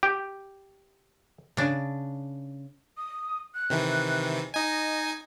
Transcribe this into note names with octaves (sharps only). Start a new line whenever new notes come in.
G4
C#3 D4
D#6
F#6
C3 D#3 E3
D#4 D#5 G#5